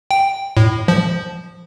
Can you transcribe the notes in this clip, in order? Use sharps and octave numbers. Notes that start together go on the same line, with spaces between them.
G5
A2
F3